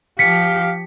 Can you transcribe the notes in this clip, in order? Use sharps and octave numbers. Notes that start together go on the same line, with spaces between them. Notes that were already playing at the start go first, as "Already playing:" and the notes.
F3 G4 F5 B6 C#7